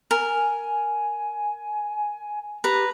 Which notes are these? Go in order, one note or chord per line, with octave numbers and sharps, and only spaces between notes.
A#4 G#5
G4 B4 A#5